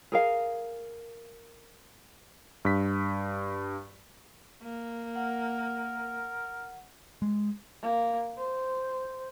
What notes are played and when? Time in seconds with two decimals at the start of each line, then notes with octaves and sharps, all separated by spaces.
0.12 G#4 A#4 F5
2.65 G2 B6
4.63 A#3
5.16 A#4 F#5
7.22 G#3
7.81 A#3
8.38 C5